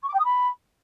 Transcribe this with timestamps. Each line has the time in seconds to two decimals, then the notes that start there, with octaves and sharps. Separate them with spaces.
0.02 C#6
0.08 D6
0.13 G5
0.19 D#6
0.24 B5